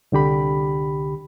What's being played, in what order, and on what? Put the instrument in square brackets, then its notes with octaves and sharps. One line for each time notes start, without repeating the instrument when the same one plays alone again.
[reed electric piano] C2 D3 G4 B5